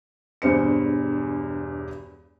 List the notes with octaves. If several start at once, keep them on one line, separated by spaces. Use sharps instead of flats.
E1 E2 G2 C5 C#7